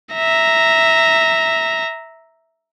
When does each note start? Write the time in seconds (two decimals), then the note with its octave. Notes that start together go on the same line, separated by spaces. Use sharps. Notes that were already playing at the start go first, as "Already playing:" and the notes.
0.14 E5 A#5